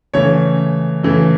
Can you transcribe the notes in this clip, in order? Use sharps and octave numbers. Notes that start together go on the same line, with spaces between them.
C#3 E3 A3 C#5
C#3 E3 A3